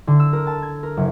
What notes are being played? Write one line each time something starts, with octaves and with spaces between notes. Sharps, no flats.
D3
E6
A#4
A5
G#6
A#4
F#1